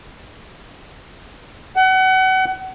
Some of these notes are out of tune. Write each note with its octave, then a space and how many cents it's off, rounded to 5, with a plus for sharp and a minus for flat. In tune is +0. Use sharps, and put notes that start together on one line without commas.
F#5 +30